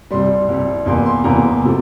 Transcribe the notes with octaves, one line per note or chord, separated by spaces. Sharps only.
C2 C3 G3 C6
C2 C3 G3
E2 C3 E3 A#3 C6
C6
E2 C3 E3 A#3 A#5
C3 F3 A3